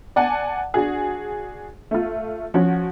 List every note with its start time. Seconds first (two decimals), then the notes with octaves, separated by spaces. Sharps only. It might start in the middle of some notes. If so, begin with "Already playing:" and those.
0.16 D5 F#5 G#5 A5
0.74 D4 F#4 G#4
1.91 A3 F4
2.54 F3 C#4 F#4